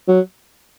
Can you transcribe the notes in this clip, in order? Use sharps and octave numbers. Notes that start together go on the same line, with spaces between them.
F#3